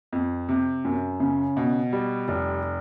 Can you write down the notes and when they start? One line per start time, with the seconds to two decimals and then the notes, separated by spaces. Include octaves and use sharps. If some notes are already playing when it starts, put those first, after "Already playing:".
0.13 F2
0.49 C3
0.85 F#2
1.20 C#3
1.57 B2
1.93 G3
2.28 F1